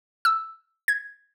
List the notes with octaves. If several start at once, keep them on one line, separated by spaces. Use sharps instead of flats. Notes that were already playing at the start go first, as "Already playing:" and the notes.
E6
G#6